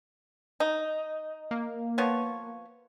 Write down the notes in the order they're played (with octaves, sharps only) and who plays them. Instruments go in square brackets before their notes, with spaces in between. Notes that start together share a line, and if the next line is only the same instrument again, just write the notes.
[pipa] D#4
[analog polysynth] A#3
[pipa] F3 B3 C#5